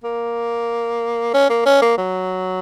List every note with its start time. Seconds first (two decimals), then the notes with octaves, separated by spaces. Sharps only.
0.04 A#3
1.34 C#4
1.50 A#3
1.66 C#4
1.82 A#3
1.98 F#3